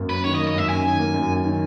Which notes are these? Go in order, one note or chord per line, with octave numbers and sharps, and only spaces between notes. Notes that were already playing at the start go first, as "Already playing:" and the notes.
Already playing: F#2 A#3
C#4 B4
D#3 C#5
D#5
A#3
D#5
F#2 E5
C#4 G#5
D#3
A#3
F#2
C#4
D#3